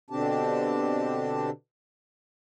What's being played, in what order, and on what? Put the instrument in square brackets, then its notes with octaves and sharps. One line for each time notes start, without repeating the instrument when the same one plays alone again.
[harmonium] B2 D3 C4 D4 G4 A5